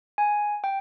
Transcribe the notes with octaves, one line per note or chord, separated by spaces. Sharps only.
G#5
G5